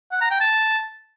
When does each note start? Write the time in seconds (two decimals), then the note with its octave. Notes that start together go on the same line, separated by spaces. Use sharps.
0.12 F#5
0.21 A#5
0.31 G5
0.40 A5